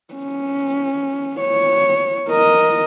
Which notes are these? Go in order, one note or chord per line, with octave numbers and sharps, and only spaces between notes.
C#4
C#5
A#4 D#5